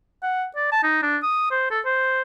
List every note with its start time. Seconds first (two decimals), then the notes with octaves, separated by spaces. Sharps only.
0.23 F#5
0.56 D5
0.72 A5
0.83 D#4
1.02 D4
1.23 D#6
1.51 C5
1.71 A4
1.85 C5